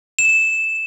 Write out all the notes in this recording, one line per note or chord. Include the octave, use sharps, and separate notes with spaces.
E7